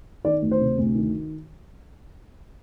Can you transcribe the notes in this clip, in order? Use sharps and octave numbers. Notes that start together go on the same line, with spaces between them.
D#3 D5
D2
C5
C3
D2
D#3